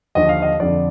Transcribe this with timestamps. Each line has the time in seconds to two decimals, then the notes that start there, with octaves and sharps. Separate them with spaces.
0.15 D#2 D3 F3 D#5
0.29 F5
0.42 D#5
0.60 F2 D3 F3 D5